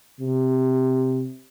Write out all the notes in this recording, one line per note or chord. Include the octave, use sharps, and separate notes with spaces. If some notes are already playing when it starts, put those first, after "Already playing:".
C3